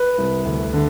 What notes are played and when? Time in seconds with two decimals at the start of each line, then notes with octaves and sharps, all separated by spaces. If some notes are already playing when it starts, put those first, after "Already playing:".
Already playing: B4
0.18 C2
0.45 D2
0.73 D3